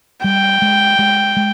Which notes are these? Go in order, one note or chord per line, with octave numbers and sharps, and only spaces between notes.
G3 G5
G#3
G#3
G#3